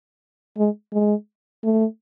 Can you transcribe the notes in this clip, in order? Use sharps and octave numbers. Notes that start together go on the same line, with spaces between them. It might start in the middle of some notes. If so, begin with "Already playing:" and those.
G#3
G#3
A3